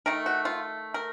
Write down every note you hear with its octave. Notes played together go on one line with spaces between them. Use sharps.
D#3 A3 A#4
F#4
F4
A#4